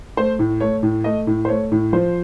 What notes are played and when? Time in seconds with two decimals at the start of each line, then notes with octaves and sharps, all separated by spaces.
0.17 A3 C5
0.39 A2
0.60 A3 C#5
0.83 A2
1.04 A3 D#5
1.27 A2
1.45 C5
1.48 A3 C#5
1.72 A2
1.93 F3 C5